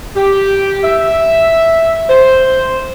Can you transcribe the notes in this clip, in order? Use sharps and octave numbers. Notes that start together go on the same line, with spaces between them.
G4
E5
C5